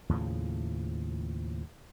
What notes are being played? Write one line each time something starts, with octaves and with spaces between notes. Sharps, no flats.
D#2 A2 C#3 F3